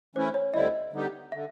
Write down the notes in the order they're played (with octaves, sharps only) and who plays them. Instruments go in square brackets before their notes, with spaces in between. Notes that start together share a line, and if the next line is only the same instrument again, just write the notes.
[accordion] E3 A3 C#4 E4 [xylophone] C5
[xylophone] C#5
[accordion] D2 D3 G3 C4 E4 [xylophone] D#5
[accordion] D3 G3 B3 D#4 G4
[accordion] D3 [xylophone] E5